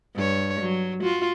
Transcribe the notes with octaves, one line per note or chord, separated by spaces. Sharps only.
G2 C#5
F#3
F4 F#4